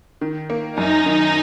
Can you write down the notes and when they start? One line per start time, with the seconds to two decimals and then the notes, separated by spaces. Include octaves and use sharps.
0.21 D#3
0.50 A#3
0.78 F#2 D#4
1.06 D#3